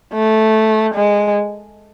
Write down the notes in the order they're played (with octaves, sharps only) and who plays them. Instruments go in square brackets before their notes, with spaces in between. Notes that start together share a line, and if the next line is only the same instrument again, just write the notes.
[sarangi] A3
G#3